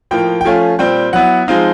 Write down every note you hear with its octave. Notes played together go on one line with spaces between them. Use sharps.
A2 F3 A#3 G5
G5
F3 A3 C#4 F4 G#5
A#2 G3 C4 G5
F#3 B3 E4 F#5
F3 G#3 C4 D#4 F5